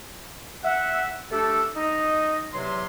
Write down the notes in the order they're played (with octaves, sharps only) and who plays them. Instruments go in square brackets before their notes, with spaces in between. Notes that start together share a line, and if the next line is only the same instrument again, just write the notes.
[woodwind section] E5 F#5
A3 D4 G4 A4
D#4 D#5
E2 C3 F#3 C6